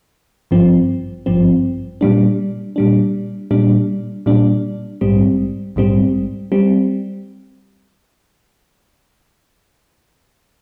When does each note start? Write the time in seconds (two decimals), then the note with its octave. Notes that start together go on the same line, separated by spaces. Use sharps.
0.51 G#1 G2 F3 C4
1.26 G#1 G2 F3 C4
2.01 A#2 G3 D4
2.76 A#2 G3 D4
3.51 A#2 G3 D4
4.26 A#2 G3 D4
5.01 A#1 G#2 G3 C4
5.76 A#1 G#2 G3 C4
6.52 G3 C4